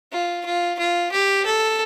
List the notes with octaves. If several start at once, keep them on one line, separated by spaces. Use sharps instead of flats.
F4
F4
F4
G4
A4